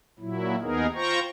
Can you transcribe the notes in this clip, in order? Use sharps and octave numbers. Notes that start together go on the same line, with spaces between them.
A#2 F#3 E4
D#2 B3 D#4 G#4 A#4
F4 C5 G5 A#5 C#6